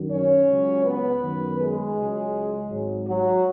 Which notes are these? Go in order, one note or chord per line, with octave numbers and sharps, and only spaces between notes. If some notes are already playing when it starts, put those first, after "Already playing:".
Already playing: F#2 D#3 F#3
C#4 C#5
C#2 C#3 F#3
B3 B4
F#2 D#3 F#3 B3
G#3 G#4
C#2 C#3 F#3
G#1 G#2 F#3
F#3 F#4